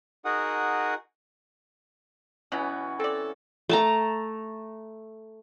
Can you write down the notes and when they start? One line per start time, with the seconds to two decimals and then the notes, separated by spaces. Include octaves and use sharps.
0.25 D#4 F#4 G#4 A#4 F#5 D#6
2.52 B2 E3 F#3 B3 C#4 F#4
3.00 C4 A4 D5
3.69 A3 A5 A#5